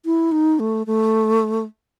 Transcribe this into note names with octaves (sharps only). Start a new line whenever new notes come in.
E4
D#4
A3
A3